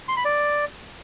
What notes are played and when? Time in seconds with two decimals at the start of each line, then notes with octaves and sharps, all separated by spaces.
0.08 C6
0.17 B5
0.25 D5